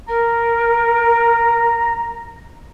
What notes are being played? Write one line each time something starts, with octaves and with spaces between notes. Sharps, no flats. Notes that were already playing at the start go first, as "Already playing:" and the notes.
A#4 A#5